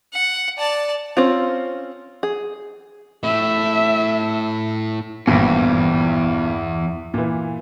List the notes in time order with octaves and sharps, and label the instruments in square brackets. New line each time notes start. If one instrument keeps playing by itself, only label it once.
[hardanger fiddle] F#5
D5 A5
[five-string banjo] C4 C#4 F4
G#4
[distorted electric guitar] A2 [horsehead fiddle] E5
[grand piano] G#1 G2 A#2 [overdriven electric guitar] E2
[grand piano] A#2 E3